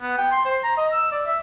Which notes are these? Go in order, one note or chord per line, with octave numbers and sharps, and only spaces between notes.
B3
G5
C6
C5
A#5
D#5
E6
D5
E5